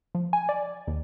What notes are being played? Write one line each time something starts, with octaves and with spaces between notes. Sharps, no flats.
F3
G#5
D5
D#2